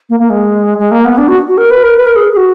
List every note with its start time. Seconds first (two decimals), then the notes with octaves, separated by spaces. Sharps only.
0.10 A#3
0.20 A#3
0.30 G#3
0.78 G#3
0.91 A#3
1.05 B3
1.18 D4
1.28 F#4
1.48 F#4
1.58 A#4
1.71 B4
1.83 A#4
1.97 B4
2.06 A#4
2.16 G#4
2.33 G#4
2.37 F#4